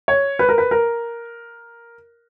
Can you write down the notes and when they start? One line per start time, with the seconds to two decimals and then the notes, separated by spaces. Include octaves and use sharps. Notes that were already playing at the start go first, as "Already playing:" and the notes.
0.08 C#5
0.39 B4
0.49 A#4
0.58 B4
0.71 A#4